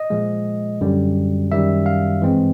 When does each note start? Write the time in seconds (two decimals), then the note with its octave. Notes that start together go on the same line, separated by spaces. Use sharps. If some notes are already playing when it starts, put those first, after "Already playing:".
Already playing: D#5
0.10 A#2 F3 G#3
0.81 F#2 D3 G3
1.51 F#2 D#3 G3 E5
1.86 F5
2.22 G2 E3 G#3 C4